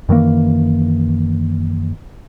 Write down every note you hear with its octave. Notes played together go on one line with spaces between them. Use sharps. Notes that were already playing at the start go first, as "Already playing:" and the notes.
F#2 D#3 E3 A#3